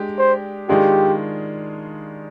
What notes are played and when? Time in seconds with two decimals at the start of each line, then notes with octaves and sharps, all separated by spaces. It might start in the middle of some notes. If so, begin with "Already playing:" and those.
Already playing: G#3 D4 G4
0.18 C5
0.69 D#3 G#3 D4 F4 G4 G#4